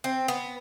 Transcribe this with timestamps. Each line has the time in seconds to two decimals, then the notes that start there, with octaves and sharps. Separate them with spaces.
0.04 C4
0.28 B3